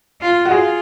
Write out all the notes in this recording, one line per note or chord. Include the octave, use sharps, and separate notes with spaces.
F4
F#4
F4 G#4